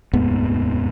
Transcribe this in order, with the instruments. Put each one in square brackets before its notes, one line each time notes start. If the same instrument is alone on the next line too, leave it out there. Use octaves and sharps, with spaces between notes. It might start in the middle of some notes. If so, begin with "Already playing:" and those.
[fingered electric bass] F1 D#2 G#2 B3